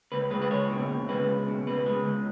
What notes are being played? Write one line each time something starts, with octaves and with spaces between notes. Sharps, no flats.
C#2 B4
G#3 B4
B4
C#2 C#5
B2
C#2
G#3 B4
C#2
B2
C#2 B4
G#3
C#2